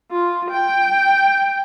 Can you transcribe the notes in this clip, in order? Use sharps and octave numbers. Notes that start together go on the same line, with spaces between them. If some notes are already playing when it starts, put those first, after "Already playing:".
F4
G5